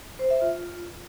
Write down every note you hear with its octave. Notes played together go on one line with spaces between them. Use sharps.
C5
E5
F4